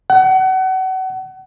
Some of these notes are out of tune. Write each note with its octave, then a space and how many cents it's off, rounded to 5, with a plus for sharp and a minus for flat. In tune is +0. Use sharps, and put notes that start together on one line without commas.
F#5 +30